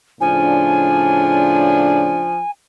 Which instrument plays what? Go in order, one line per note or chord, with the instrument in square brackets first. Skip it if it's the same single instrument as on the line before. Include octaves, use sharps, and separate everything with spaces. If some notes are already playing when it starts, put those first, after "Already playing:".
[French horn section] A2 C#3 D4 [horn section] F3 [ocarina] G#5